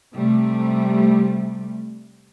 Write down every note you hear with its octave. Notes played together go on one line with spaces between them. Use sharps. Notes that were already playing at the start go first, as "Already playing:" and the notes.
C3 G3 A3